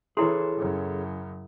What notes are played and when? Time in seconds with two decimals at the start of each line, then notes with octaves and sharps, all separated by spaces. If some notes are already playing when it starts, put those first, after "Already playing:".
0.17 E3 E4 G#4 A4 C#5 C6
0.58 F#2 C#3